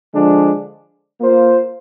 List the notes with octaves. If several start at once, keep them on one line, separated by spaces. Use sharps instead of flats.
D3 F3 G#3 D4
A#3 F4 C5